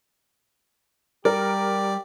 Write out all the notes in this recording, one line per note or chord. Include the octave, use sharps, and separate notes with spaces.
G3 G4 A#4 D5